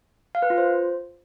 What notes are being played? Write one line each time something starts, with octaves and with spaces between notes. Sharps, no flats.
F5
B4
F4
C5